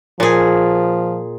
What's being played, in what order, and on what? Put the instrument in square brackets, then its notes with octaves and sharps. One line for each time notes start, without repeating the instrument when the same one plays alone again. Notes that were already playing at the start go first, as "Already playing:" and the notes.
[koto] A#2 G#4 [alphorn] F3